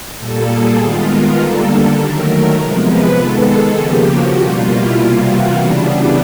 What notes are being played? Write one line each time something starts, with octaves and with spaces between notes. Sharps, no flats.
A#2 G3 A#3 A4
G#4
D#3 G#3 B3 F4
A#4
D3 G3 A#3 A4
D#3 F#3 A3 A#4
C3 F3 G#3 B3
B4
D#3 G#3 B3 A4
G#4
C#3 F3 A#3 G4
F#4
B2 G3 A#3 F4
E4
C3 E3 G3 A#3 F4
F#4
C#3 E3 G3 B3 D4